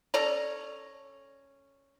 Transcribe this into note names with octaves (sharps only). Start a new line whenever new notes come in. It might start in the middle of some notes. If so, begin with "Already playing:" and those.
C#4 A4 D5 A#5